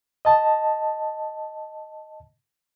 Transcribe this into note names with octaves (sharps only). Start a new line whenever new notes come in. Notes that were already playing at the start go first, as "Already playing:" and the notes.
D#5 A5